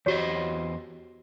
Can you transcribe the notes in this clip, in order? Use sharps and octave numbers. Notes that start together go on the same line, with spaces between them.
E2 F#4 G4 C5 C#5 D#5